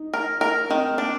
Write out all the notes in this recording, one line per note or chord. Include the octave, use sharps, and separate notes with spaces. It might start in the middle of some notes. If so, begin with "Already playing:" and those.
Already playing: D#4
A#4
A#4
D#3 C4
A#3
D4